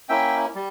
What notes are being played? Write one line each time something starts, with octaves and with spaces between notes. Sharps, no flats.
A#3 C#4 E4 E5 G5
G3